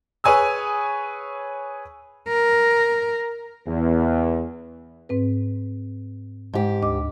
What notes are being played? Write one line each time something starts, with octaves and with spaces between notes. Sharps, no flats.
G#4 B4 C#5 G#5 D#6 E6
A#4
E2
G#2 C4 B4
G#2 G4
D2 D#5 D6